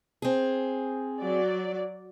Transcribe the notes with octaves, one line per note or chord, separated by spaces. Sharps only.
C4 G#4
F#3 D5